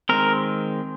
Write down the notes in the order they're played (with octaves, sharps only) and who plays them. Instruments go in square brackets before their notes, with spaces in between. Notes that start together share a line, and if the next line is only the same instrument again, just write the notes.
[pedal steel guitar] D#3 G#3 C4 A#4